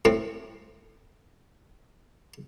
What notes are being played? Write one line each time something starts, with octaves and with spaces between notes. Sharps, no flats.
A2 C4